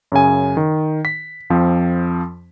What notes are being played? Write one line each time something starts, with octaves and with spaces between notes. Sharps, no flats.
F#2 C#3 G#5
D#3
B6
F2 F3 C4